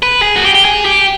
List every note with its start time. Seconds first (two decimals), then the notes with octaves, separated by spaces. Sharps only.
0.03 B4
0.22 G#4
0.36 F#4
0.44 G4
0.55 G4
0.65 G#4
0.85 G4